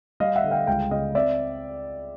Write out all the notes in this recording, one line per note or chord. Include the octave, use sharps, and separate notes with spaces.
G3 D#5 F5
E5 F#5
D3
F5 G5
C#2 F5 G5
C#3 D#5 F5
C4 D5 E5